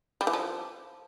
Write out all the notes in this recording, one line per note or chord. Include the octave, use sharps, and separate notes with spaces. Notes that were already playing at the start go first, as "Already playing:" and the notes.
G3
E3
F3